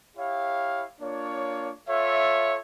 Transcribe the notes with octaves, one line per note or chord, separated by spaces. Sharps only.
E4 G4 C#5 F5
A#3 D4 F4 C#5
F4 A4 C#5 E5